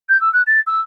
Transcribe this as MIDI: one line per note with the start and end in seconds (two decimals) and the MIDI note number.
0.09 0.19 91
0.21 0.29 88
0.33 0.42 90
0.47 0.60 93
0.67 0.80 88